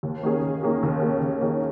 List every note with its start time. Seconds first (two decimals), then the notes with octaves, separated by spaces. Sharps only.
0.03 D#2
0.23 D#3 A#3 C#4 G#4
0.42 D#2
0.63 D#3 A#3 C#4 G#4
0.83 D#2
1.02 D#3 A#3 C#4 G#4
1.21 D#2
1.41 D#3 A#3 C#4 G#4